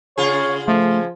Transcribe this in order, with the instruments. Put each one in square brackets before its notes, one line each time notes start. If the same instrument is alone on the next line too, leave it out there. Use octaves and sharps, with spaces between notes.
[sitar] C#3 F4 G#4 [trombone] C#5
[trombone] F3 [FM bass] A3